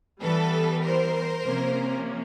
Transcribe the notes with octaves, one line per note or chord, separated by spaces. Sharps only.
E3 G3 B3 A4 B4
A#4 C5
C3 F3 A#3 C#4